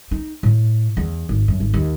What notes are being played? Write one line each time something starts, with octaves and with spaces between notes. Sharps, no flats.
D#4
A2
E2
G#1
F#2
G#1
D#2